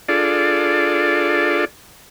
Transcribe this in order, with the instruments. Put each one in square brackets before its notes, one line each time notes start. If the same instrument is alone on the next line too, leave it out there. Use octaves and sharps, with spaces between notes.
[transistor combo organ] D4 F4 G#4 A4 D5